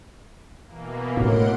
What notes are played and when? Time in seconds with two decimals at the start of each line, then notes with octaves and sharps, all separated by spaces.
0.66 B2 E3 A#3
1.17 A2 A#4 F#5 C6 D7